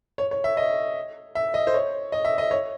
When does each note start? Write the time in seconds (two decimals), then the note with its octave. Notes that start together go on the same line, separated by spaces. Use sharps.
0.18 C#5
0.31 C#5
0.44 E5
0.57 D#5
1.35 E5
1.54 D#5
1.67 C5
1.74 C#5
2.12 D#5
2.25 E5
2.38 D#5
2.51 C#5